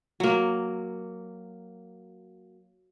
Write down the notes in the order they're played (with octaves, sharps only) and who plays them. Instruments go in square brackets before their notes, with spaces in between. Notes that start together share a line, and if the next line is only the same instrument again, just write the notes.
[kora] F#3 A#3